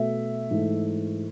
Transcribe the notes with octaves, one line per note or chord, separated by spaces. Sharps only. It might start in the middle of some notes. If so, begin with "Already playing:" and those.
Already playing: B2 A3 E5
G#2 E3 A3